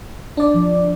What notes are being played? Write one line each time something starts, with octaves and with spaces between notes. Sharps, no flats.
D4 D5
F3